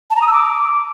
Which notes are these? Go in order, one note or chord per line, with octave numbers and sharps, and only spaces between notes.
A5
A#5
D#6
E6
D6